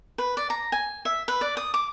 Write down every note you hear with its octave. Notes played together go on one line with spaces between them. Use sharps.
B4
D5
A#5
G#5
E5
B4
D5
D#6
D6